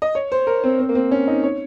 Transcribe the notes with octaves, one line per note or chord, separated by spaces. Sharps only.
D#5
C#5
C5
A#4
C4
C4
A#3
C4
C#4
D#4
C#5